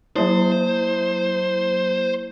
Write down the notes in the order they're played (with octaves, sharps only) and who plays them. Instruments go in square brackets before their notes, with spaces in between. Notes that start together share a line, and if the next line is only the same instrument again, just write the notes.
[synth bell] F#3 A#3 E4 [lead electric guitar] C5